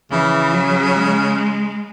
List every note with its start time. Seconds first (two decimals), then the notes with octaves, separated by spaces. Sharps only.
0.11 C#3 E3
0.53 F#3
0.95 G#3